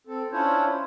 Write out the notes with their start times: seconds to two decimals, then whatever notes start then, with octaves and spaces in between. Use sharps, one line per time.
0.07 C4 A4
0.32 C#4 D4 E4 F4 C5 C#5